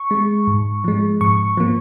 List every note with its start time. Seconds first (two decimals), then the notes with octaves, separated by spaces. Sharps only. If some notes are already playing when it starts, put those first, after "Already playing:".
Already playing: C#6
0.11 G#3
0.47 G#2
0.84 F3 G#3
1.21 G#2 C#6
1.57 F3 A#3